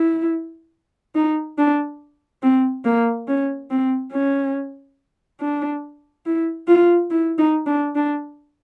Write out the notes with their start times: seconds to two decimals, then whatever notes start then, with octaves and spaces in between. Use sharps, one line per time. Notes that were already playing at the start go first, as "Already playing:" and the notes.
Already playing: E4
1.15 D#4
1.58 D4
2.43 C4
2.85 A#3
3.28 C#4
3.70 C4
4.12 C#4
5.41 D4
6.26 E4
6.68 F4
7.11 E4
7.38 D#4
7.67 D4
7.96 D4